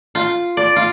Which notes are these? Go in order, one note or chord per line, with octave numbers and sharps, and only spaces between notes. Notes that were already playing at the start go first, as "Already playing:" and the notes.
F4
D5
F4